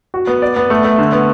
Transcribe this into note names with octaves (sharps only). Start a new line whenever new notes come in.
F#4
B3
D5
B3
A3
A3
D3
B3